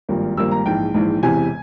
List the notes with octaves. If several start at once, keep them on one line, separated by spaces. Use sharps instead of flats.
G#1 G2 F3 A#3
G#1 G2 F3 A#3 E6
A#5
A#1 G#2 E3 G5
A#1 G#2 E3
E1 E2 C3 E3 G#5